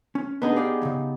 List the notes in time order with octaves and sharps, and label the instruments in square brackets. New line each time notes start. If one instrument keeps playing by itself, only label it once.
[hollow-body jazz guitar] C#4
[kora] B3 D#4 G#4 [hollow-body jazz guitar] D4 B4
[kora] G4 [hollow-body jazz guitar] G#4 D5 F5
[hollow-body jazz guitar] D#2 C#3